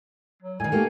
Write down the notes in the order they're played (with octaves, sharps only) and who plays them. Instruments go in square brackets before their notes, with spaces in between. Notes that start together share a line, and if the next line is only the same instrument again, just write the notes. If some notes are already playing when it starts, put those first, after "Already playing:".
[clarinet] F#3
[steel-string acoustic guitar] A2 D#3 [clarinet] G#5
[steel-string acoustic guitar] A3 A#3 G4